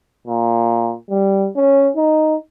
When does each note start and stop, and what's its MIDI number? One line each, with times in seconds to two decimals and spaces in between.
0.27 0.93 46
1.10 1.48 55
1.56 1.88 61
1.97 2.36 63